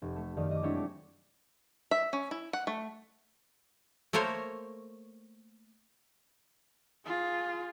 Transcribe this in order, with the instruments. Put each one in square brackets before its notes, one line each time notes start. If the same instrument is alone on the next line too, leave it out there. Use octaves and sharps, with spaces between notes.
[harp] F1
A3
F#2 D#3 A3 D5 F5 D#6
D#5 D6
F#3 G#3 C4 D4 E4 C#5
A3 D6
[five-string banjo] E5
C#4
E4
F#5
A3
[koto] A3 A#3 A#4 C5 C#5
[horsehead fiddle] F4 G#4